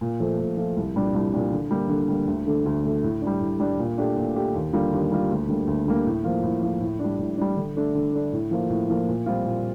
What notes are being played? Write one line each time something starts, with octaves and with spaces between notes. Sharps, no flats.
A#2
F3 A3
A#2
F3 A3
C2
A#2 G3 D4
C2
A#2 G3 D4
D3
G3 A#3
D3
G3 A#3
D2
D3 A3
D2
D3 A3
A2
D4
G3
A2
G3 D4
A#2
A3 D4 G4
A#2
A3 D4 G4
D#2
D3 G3 A#3 F4
D#2
D3 G3 A#3 F4
D2
D3 G3 A#3
D2
D3 G3 A#3
A2
F3 A#3 F4
A2
F3 A#3 F4
A2
G3 D4
A2
G3 D4
D3
A3 D4
D3
A3 D4
A2
F3 A#3 F4
A2
F3 A#3 F4
A#2
G3 C4 F4
A#2